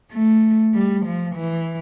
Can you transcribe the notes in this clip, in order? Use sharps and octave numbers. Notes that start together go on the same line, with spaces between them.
A3
G3
F3
E3